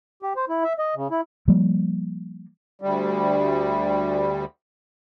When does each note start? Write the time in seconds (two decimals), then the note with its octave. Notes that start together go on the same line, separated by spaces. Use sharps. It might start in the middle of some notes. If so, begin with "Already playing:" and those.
0.22 G4
0.36 C5
0.49 E4
0.64 E5
0.79 D#5
0.96 C#3
1.11 E4
1.48 F3 G3 A#3
2.81 D2 G3